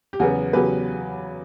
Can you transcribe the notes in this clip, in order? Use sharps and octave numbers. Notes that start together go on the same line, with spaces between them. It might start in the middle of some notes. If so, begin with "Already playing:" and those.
G4
E2 C#3 F#3 B3 F#4
E2 C#3 F#3 B3 G4 B4